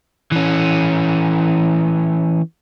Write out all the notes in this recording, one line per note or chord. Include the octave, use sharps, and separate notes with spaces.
E3 C#4